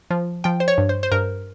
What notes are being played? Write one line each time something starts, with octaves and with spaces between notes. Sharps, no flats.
F3
F3 G5
C5
C#5
G2
C5
C5
G2 A#4